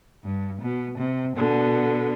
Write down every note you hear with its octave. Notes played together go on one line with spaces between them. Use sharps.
G2
B2
C3
B2 D3